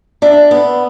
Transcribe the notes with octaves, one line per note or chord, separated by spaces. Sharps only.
D4 E5
B3